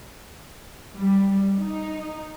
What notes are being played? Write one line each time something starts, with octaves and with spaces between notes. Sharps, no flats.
G3
D#4